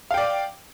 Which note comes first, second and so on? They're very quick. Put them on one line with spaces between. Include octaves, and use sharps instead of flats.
F5 G5 D5